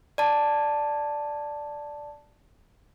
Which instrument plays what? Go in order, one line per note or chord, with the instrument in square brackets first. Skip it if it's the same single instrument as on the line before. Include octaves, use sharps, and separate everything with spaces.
[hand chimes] D5 A5